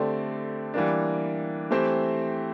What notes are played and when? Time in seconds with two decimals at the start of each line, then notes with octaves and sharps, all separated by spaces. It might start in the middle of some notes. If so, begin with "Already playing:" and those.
Already playing: D3 A3 C4 G4 D5
0.74 E3 G3 A#3 D4
1.71 E3 A3 C4 G4 C5